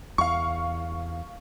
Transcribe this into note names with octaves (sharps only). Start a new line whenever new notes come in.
E2 F5 C#6